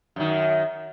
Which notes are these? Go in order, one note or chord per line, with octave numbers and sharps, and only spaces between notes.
F#2 D#3